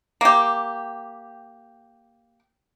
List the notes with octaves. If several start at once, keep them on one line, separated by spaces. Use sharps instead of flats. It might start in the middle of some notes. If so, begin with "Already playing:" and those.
A#3 G4